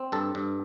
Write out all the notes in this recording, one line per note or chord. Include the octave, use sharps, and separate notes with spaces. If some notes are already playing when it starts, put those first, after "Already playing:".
Already playing: C4
G2 A4
G2